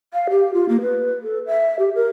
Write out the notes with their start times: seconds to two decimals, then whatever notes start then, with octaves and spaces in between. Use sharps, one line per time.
0.13 F5
0.30 G4
0.54 F4
0.69 A#3
0.82 B4
1.23 A4
1.47 E5
1.79 G4
1.95 A#4